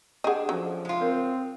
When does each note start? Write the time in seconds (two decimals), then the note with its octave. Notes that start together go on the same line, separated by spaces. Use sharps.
0.24 D4 G4 G#4 D#5 F#5
0.49 F3 F#3 C#4 A4
0.85 G#3 F4
1.00 C4 A#4 C5 C#5